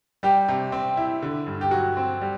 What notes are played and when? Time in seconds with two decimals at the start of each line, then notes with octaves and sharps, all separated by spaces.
0.23 G3 G4
0.48 C3
0.72 C4
0.97 E4
1.22 D3
1.47 G2
1.61 G4
1.71 F#3 F#4
1.97 C4
2.21 G3